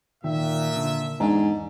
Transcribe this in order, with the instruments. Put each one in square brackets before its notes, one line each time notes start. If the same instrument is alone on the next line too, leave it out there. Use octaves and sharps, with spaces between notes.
[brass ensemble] A#2 E5 [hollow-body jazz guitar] D#3
[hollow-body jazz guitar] D3
[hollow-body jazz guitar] E2 D4 [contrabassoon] G#2